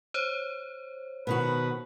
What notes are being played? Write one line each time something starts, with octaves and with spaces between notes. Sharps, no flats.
C5 C#5
B2 D#3 F#4 B4